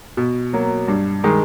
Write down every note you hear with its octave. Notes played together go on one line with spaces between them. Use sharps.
B2
F#3 A#3
G2
D#3 G#3